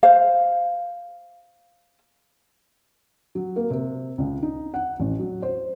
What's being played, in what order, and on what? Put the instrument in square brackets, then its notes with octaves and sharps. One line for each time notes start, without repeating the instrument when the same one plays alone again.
[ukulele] C5 F5
[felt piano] F#3
A#3
C3
C#2
D#4
F#5
A1
F#3
C5